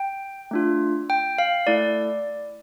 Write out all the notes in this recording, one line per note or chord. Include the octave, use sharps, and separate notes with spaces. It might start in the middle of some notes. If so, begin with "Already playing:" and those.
Already playing: G5
A3 D4 F4
G5
F5
A3 E4 A4 D5